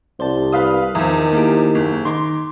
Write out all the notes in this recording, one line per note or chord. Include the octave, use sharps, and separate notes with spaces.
C2 C5 D5 A5
B4 F5 D#6
E2 D#3 F3 E5
A#3 E4 G4
F#1
D#3 D#4 C6 D6